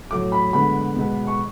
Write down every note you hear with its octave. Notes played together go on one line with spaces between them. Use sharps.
A2 F#3 A3 D6
B5
D3 G#3 B3 B5
B2 G#3 B3
C#6